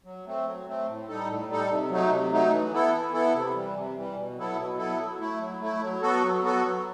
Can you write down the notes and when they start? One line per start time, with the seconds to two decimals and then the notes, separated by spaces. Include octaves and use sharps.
0.05 F#3
0.26 A3 C4
0.45 F#3
0.66 A3 C4
0.87 A2
1.08 G3 D#4 A4
1.28 A2
1.48 G3 D#4 A4
1.69 C3
1.90 F#3 A3 D#4
2.10 C3
2.31 F#3 A3 D#4
2.51 E3
2.72 B3 E4 A4
2.93 E3
3.13 B3 E4 A4
3.34 C3
3.54 E3 G3
3.75 C3
3.96 E3 G3
4.17 B2
4.36 F#3 B3 E4 A4
4.58 B2
4.78 F#3 B3 E4 A4
4.99 F#3
5.19 A3 E4
5.39 F#3
5.60 A3
5.65 E4
5.81 F#3
6.02 B3 F#4 A4
6.22 F#3
6.42 B3 F#4 A4
6.63 F#3